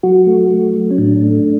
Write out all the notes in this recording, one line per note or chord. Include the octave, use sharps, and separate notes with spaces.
F#3 F#4
A3
A3
F#3
C#4
A2 D4
A3